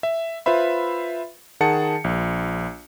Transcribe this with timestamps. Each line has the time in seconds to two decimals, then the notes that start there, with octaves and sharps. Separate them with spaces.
0.03 E5
0.46 F4 B4 C5 E5 B5
1.60 D#3 G#4 F#5 A5 C#7
2.04 A#1